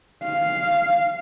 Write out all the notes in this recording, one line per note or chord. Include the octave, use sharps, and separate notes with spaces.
F5